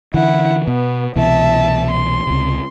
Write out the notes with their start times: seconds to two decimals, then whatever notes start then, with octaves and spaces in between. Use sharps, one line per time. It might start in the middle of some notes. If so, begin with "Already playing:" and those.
0.14 D3 E3 E4 F#5
0.68 B2 B3
1.16 C2 B2 E3 E5 A5
1.91 C6
2.27 C#2 C3